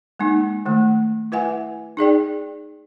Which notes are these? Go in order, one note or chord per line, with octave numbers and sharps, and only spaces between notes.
G#3 A#3 D#4
D#3 A3
E4 B4 E5 F#5 G#5
D#4 G#4 D5 G5